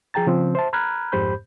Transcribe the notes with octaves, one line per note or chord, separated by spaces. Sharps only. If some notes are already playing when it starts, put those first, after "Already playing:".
F3 G#4 G5 A#5 A6
C#3 F3 C4
C5 E5 A5
A#5 B5 F6 F#6 G#6
F2 G#2 G4 C5 B5 G6